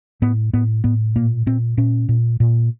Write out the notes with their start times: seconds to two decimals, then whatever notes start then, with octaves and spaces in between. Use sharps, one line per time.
0.22 A2 B3
0.53 A2 B3
0.84 A2 B3
1.16 A#2 A#3
1.46 A#2 C4
1.77 A#2 C#4
2.09 A#2
2.40 A#2